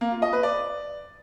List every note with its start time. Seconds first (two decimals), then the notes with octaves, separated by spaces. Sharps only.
0.01 A#3
0.12 F4
0.22 D#5
0.33 B4
0.43 D5